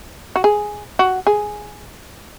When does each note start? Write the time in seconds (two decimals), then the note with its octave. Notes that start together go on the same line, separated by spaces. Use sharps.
0.36 F#4
0.44 G#4
0.99 F#4
1.27 G#4